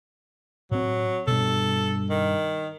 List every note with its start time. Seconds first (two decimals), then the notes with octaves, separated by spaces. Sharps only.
0.71 A2 F#3 C4
1.27 G2 B2 A4
2.10 D#3